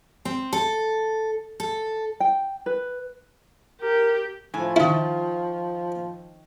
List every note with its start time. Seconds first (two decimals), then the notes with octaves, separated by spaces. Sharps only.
0.25 C4
0.53 A4
1.60 A4
2.20 G5
2.66 B4
3.82 G4 A#4
4.54 A2 F3 G#5
4.76 D#3 E4 F4